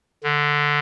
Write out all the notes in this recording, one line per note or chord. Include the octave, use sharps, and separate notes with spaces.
D3